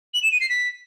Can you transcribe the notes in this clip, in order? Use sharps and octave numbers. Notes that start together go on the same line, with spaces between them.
F#7
E7
D#7
C7
B6